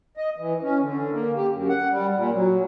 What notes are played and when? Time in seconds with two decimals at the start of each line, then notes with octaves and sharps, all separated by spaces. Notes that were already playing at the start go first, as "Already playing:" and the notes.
0.17 D#5
0.38 E3
0.62 C#4
0.81 D3
1.11 A#3
1.35 G4
1.50 F#2
1.69 F#5
1.90 G3
2.16 A#2
2.33 F#3